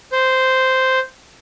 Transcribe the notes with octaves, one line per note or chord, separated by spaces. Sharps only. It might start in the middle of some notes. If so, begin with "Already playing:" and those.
C5